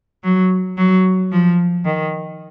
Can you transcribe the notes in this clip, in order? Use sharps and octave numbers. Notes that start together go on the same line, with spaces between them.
F#3
F#3
F3
D#3